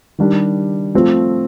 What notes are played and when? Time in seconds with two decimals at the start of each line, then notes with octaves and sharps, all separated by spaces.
0.18 D#3 G3 D4 G4
0.94 F3 A3 C4 F4